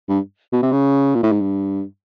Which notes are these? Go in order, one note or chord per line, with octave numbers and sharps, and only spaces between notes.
G2
B2
C3
C#3
A#2
A2
G#2
G2